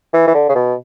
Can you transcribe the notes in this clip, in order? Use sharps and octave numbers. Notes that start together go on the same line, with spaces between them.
E3
E3
D3
C#3
B2